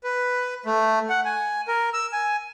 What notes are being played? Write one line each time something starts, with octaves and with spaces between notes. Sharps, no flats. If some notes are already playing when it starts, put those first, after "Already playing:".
B4
A3
F#5
G#5
A#4
E6
G#5